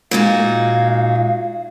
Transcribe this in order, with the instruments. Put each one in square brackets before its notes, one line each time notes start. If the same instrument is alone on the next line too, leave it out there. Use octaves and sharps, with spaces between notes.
[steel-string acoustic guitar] A#2 G#3 D#4 F#4 [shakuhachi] F5